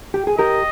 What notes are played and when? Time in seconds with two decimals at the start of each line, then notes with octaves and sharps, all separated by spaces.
0.14 G4
0.27 G#4
0.38 G4 A#4 D#5